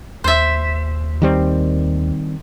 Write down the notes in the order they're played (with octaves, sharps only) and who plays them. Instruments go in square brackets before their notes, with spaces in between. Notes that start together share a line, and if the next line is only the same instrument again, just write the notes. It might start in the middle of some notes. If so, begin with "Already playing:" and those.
[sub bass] D#2 [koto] C5 E5
[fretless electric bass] D#3 G3 C4